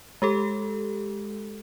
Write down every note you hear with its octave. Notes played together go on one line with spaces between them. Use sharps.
G#3 G4 A4